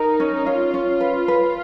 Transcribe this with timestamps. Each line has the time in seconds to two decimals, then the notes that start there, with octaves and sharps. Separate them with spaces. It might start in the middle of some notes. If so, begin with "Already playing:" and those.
Already playing: D#4 A#4
0.20 C#4
0.46 C#4 F4
0.74 C#4
1.00 B4
1.28 B4